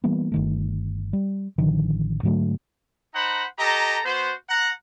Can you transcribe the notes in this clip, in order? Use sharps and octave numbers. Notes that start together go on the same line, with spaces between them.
E3 G3 A#3 B3
G1 D#3 A3
G3
A1 D3 D#3 F3
G#2 D3 F#3 A3
D#4 C5 F#5 A#5 B5
G4 A4 D#5 A#5
B3 F#4 C5
F#5 A#5